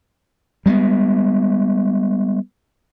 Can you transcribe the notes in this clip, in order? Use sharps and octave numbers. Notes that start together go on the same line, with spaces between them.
G3 G#3 A#3 B3